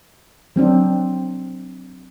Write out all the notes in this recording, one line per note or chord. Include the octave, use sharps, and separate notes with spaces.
F#3 C4 D4